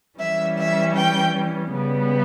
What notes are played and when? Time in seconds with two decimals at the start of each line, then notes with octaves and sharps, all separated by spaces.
0.19 E3 G3 C#4 E5
0.57 E5
0.95 G5
1.72 C#3 G3 B3